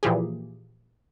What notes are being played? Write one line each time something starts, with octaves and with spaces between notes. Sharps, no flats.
A#2 E3 F3 G4 G#4